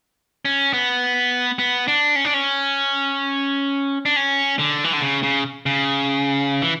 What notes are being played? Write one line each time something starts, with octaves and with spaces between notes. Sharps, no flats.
C#4
B3
B3
D4
C#4
D4
C#4
D4
C#4
D3
E3
D3
C#3
C#3
C#3
E3